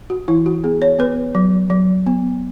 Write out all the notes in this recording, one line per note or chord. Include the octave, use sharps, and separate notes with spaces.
F#4
E3 E4
F#4
B3 G#4
C#5
B3 B4
F#3
F#3
B3